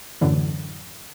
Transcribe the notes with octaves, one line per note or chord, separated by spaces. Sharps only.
F#2 A2 D3 E3